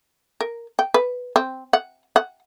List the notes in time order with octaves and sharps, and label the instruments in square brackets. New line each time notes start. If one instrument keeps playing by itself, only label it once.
[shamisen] A#4
G5
B4
C4
F#5
F#5